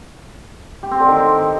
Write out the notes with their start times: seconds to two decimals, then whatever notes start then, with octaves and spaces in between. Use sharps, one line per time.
0.83 G4
0.91 C4
1.00 D3
1.08 D#3
1.17 C4